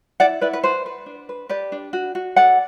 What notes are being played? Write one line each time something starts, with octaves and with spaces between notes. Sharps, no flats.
E4 D5 F#5
E4 B4 D5
B4
B4 C5
B4
D4
B4
G4 B4 D5
D4
F#4
F#4
A4 D5 F#5